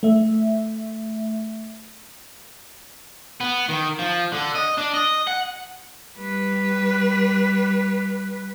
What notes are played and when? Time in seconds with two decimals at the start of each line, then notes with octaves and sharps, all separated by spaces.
0.03 A3 E5
3.40 B3
3.69 D#3
3.99 F3
4.32 D3
4.55 D#5
4.78 D4
4.94 D#5
5.27 F#5
6.17 G3 B4